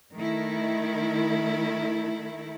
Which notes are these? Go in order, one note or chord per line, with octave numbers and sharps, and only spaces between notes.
D#3 A3 E4